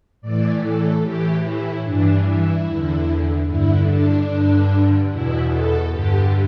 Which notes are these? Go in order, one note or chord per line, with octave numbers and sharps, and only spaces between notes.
A2 E3 D5
A4
A2 E3 G4
E4
G2 E3 D4
E4
E2 D3
G2 D3 E4
D4
G2 D3
E2 B2 E4
A4
G2 D3 G4